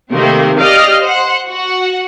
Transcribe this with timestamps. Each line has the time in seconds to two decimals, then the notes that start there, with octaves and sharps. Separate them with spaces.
0.11 C3 D#3 A3 A#3 C4
0.58 G4 D5 D#5 F5 F6
1.01 C5 F#5
1.48 F#4 F#5